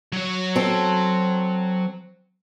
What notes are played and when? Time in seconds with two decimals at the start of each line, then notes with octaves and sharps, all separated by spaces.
0.13 F#3 C#5
0.56 C4 A4